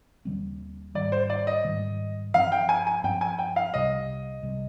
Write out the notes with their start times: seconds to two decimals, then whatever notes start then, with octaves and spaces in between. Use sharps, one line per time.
0.25 D#2 D3 G3 C4
0.95 G#2 D#3 G3 D5
1.12 C5
1.30 D5
1.47 D#5
1.65 G#2 D#3 G3
2.34 G2 F3 C4 F5
2.52 G5
2.69 G#5
2.87 G#5
3.04 G2 F3 C4 G5
3.21 G#5
3.39 G5
3.56 F5
3.74 C2 C3 G3 D#5
4.43 C2 C3 G3